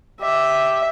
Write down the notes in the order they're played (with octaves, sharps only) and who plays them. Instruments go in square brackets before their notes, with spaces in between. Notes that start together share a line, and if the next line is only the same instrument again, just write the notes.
[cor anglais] G4 [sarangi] E5